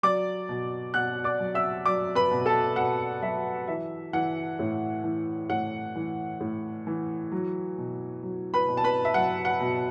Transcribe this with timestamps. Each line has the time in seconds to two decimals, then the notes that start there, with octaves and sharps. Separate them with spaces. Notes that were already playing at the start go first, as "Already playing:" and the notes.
0.03 F#3 D5 D6
0.49 B2
0.94 B2 F#5 F#6
1.24 D5 D6
1.40 F#3
1.55 E5 E6
1.85 F#3 D5 D6
2.15 B4 B5
2.31 B2
2.46 A4 A5
2.76 B2 F#5
3.22 F#3 E5
3.68 E3 E5
4.13 E3 F#5
4.59 A2
5.04 E3
5.49 A2 F#5
5.95 E3
6.40 A2
6.87 E3
7.32 F#3
7.78 B2
8.23 F#3
8.54 B4 B5
8.68 B2
8.77 A5
8.84 B4 B5
9.05 E5
9.14 F#3 F#5
9.45 F#5
9.60 B2